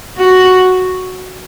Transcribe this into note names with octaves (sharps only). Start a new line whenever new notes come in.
F#4